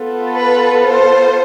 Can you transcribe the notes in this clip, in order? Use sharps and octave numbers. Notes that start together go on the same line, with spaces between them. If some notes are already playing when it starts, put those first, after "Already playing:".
Already playing: B3 F4 A4
B4
C5